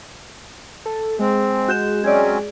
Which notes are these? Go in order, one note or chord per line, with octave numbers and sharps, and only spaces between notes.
A4
G#3 C4
F#4 G6 E7
F#3 C4 C#4 G#4 D5